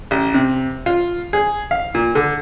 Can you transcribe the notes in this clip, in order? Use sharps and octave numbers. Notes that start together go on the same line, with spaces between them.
A1
C3
F4
G#4
F5
A#2
D3